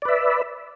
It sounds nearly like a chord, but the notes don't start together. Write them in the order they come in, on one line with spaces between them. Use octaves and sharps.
D5 B4 E5